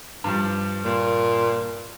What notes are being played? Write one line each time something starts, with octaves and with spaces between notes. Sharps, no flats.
G2 F3 G3
A#2